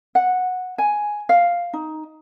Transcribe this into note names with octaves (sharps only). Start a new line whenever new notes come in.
F#5
G#5
F5
D#4